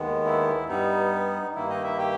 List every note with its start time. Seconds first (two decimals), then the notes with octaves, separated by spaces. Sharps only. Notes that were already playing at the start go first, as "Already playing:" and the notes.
Already playing: D#2 D#3 G#3 B3
0.25 E4
0.68 G2 G3 B3 D#4
1.55 G2 D#3 A#3 E4
1.69 D#4 D#5
1.84 E4 E5
1.99 G4 G5